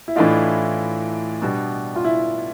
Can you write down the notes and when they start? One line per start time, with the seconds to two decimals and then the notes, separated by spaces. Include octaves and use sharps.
0.08 E4
0.16 A2 E3 A3 D4 D#4 F4
1.42 B2 G3 B3 D4
1.96 F4
2.04 E4